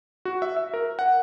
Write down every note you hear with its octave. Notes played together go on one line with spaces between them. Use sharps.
F#4
E5
E5
A#4
F#5